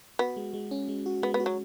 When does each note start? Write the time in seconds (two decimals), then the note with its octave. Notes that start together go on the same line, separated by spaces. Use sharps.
0.19 B3 F#4
0.37 G#3
0.54 G#3
0.71 C#4
0.89 G#3
1.06 F#4
1.23 G#3 B3
1.34 B3
1.40 F#4
1.46 F#3